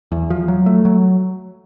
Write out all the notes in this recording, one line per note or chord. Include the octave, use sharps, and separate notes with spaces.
E2
F3
F#3
A3
F#3